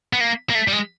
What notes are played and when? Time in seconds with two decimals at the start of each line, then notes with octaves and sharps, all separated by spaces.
0.13 B3
0.21 A#3
0.50 A#3
0.55 A3
0.68 G3
0.73 G#3